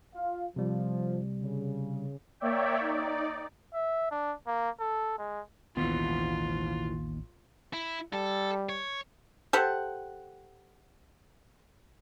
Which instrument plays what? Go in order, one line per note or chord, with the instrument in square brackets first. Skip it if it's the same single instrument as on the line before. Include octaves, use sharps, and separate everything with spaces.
[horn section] F4 F5
[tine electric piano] C3 G3 [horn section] F3
[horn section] C#3
[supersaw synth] A#3 C#5 D5 E5 G5
D#4 D5
[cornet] E5
D4
A#3
A4
G#3
[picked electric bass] A1 B3 [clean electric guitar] D#2 [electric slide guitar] B2 D#3 E3 [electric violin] F4
[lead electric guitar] E4
[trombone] G3 [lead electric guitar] A4
[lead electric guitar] C#5
[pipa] G4 A4 C5 F#5